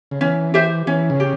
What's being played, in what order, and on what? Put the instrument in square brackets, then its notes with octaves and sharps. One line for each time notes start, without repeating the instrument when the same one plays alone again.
[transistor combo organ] C#3
[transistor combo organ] E3 [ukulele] C#4
[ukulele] G4 C5 E5
[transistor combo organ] E3 [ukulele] C#4
[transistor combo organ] C#3
[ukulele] G4